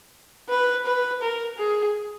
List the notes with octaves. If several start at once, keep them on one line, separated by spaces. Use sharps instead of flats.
B4
B4
A#4
G#4